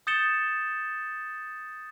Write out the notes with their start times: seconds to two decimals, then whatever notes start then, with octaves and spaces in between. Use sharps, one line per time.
0.07 D#6 G6 A6 C#7 E7 G7